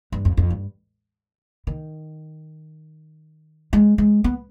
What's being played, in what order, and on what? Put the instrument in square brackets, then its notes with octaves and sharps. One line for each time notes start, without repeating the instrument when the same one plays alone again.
[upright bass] G2
F2
F2
G2
D#3
G#3
G#3
B3